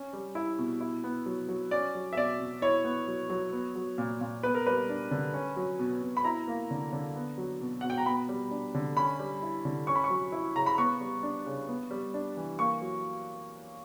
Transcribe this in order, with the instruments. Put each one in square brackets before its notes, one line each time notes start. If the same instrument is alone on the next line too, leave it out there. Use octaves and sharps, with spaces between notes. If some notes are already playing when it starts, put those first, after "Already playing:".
Already playing: [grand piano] C#4
G3
E4
B2
E4
B3
F#3
F#3
C#4 D5
F#3
E5
B2 D5
B2
E4 C#5
B3
F#3
F#3
B3
F#3
A#2
A#2
B3 B4
A#4
G3 B4
D4
D3
C#4
F#3
B2
B2
B5
E4 A#5
A#3
D3
D3
B3
F#3
B2
B2 F#5
G5
A#5
B3 B5
G3
D4
D3
C#4 B5
G3
E4
D3
C#4 C#6
B5
C#6
F#3
E4
C#3 A#5
B5
B3 C#6
G3
D4
C#3
B3
G3
D4
E3
A#3 C#6
F#3